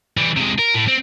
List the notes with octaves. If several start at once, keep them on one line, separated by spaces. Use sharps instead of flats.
E3 G3
C3 G#3
A#4
A2
C4